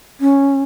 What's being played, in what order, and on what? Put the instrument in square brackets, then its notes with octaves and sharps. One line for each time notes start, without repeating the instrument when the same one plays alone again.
[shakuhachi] C#4